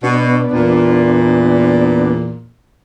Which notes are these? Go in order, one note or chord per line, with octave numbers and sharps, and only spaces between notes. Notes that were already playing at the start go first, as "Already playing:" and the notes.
B2 B3 D4
E2 A#2